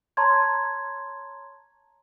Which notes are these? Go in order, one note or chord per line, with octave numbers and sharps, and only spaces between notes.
C#5 A5 A#5 C6 C#6 G#6